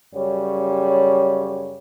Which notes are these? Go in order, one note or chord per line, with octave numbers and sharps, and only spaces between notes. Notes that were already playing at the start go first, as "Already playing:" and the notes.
F#2 C#3 G3 C#5